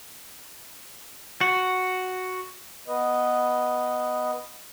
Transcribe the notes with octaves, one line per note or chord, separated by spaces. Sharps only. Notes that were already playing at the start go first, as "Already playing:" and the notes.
F#4
B3 B4 D#5